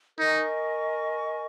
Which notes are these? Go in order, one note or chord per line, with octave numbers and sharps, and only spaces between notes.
D#4 A#4 D#5 G#5 C#6